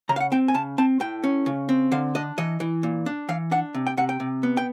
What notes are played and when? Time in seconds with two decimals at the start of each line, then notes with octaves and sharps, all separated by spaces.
0.09 C#3 A#5
0.16 F5
0.20 F#5
0.32 C4 G5
0.48 G#5
0.54 C#3 A5
0.78 C4 A5
1.00 A2 G5
1.24 C#4
1.46 C#3
1.69 C4
1.92 D3 F5
2.15 D4 D#5
2.38 E3 D#5
2.60 E3
2.83 A#2
3.06 D4
3.29 E3 F5
3.51 D4 F#5
3.74 C3
3.87 G5
3.97 C3 F#5
4.09 G5
4.20 C3
4.43 B3
4.57 G5